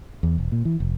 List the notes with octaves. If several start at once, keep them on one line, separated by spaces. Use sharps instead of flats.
E2
E1
A#2
E3
F1